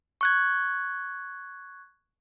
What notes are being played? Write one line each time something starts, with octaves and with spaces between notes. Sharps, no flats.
C#6 F#6 G#6